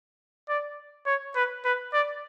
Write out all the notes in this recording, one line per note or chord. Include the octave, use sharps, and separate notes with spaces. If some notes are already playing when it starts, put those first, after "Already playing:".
D5
C#5
B4
B4
D5